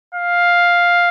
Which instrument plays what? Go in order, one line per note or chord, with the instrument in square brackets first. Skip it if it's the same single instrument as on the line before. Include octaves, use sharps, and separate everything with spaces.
[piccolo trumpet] F5